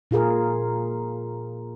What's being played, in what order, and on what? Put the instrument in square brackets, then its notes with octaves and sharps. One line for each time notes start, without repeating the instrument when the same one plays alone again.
[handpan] A#2 F4 G#4 A#4